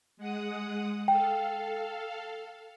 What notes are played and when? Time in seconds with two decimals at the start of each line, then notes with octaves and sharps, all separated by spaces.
0.17 G#3 F#5 D#6
1.08 A4 F5 G5